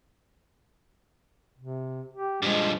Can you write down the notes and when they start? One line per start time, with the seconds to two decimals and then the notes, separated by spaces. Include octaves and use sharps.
1.58 C3
2.14 G4
2.42 G2 F3 G#3